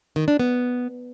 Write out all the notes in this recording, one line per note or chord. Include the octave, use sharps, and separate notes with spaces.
D#3
D4
B3